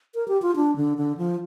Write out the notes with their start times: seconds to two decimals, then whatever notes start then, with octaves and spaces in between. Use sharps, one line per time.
0.15 A#4
0.28 G4
0.42 F4
0.56 D4
0.76 D3
0.97 D3
1.18 F3